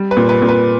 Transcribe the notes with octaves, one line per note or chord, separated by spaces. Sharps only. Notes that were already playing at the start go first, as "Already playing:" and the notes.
Already playing: G3
B4
A#2
B4
A#2
B4